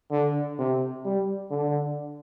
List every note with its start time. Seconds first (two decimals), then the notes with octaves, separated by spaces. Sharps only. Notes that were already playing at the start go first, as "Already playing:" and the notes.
0.11 D3
0.58 C3
1.05 G3
1.51 D3